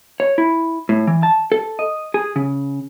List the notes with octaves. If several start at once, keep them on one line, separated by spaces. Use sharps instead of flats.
C#5
E4
A2
E3
A5
A4
D#5
G#4
C#3